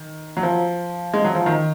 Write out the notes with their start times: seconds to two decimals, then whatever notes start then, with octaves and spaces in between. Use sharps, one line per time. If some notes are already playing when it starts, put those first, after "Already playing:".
Already playing: D#3
0.37 F#3
0.43 F3
1.14 G#3
1.25 F#3
1.35 F3
1.46 D#3